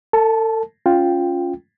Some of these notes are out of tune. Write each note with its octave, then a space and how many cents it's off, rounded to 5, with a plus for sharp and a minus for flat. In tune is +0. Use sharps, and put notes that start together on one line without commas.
A4 +35 A5 -15
C#4 +0 F4 +5 G5 +0